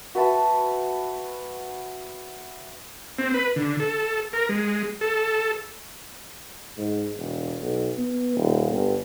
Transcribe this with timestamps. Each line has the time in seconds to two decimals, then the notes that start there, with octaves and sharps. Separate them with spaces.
0.15 F#4 B4 E5 A5
3.19 C4
3.34 B4
3.56 D3
3.80 A4
4.33 A#4
4.49 G#3
5.01 A4
6.78 G#2
7.17 E1
7.61 B1
7.97 B3
8.36 D#1
8.71 G1